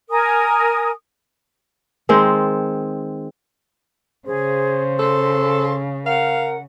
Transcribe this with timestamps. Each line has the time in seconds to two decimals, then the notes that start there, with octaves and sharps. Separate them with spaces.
0.11 A#4 G#5 D#6
2.09 D#3 G#3 C4
4.27 C#3 G#4 C5
4.99 A4 C6
6.06 A#4 F5 F#5